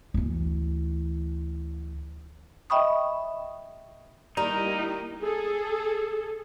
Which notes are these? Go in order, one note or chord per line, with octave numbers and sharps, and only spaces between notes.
D2 E3
D#5 E5 G5 B5 C#6 D#6
D#3 G3 A#3 D#4 E4 G4 A#4
G#4 A4